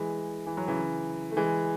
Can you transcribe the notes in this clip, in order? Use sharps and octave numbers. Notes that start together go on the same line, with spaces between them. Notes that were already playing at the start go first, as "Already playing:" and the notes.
Already playing: E3 G#3
E3
F#3
C#3 E3
A3
E3 G#3